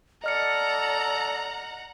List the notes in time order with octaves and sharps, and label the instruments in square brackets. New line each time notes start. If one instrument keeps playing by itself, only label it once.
[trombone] A4 [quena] D5 [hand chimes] D#5 F6 C#7 [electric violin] F#5 A#5